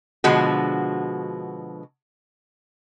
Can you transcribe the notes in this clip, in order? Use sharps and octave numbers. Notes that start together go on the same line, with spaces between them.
B2 D3 F3 G#3 F#4